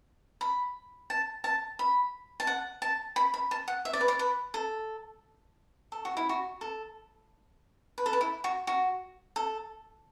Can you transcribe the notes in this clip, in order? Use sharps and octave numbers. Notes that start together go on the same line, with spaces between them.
B5
A5
A5
B5
A5
F#5
A5
B5
B5
A5
F#5
E5
D5
B4
D5
B4
A4
A4
F#4
E4
F#4
A4
B4
A4
B4
E4
F#4
F#4
A4